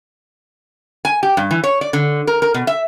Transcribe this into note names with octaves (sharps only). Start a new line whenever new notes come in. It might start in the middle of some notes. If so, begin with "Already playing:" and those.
G#5
G4
G2
E3
C#5
D5
D3
A#4
A#4
B2
E5